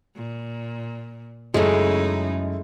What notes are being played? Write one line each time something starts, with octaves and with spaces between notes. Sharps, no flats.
A#2
F#2 C#3 G#3 A3 D#4 E4